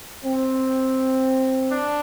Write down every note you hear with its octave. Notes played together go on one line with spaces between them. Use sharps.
C4
D4